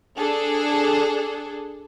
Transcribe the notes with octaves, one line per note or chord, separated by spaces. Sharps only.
D4 G#4 A4